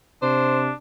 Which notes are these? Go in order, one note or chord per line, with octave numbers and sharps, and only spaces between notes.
C3 D4 C5